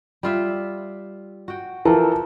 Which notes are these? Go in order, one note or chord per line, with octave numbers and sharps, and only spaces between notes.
G3 F4 E5
F#4 G5
E3 F3 A4 A#4